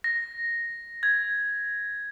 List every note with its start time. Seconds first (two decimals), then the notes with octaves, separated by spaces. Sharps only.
0.04 A#6
1.03 G#6